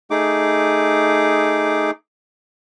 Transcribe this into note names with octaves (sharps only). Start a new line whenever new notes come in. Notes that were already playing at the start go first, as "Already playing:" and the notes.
A3 D#4 G#4 D6